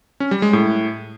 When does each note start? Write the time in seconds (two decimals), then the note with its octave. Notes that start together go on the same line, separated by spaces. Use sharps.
0.20 C#4
0.31 G3
0.42 G#3
0.53 A2